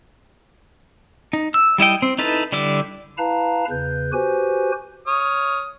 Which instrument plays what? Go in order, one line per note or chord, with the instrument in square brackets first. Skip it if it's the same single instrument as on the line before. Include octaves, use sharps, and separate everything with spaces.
[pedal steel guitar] D#4
E6
G3 E4 D#5 G5
C4
D#4 E4 A4 B4
D3 G3 E4 D6
[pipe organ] E4 B4 F5 A5 A#5
E2 C#3 B4 G6
F#4 G4 B4 C5 G#5
[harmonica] C#5 D#6 F6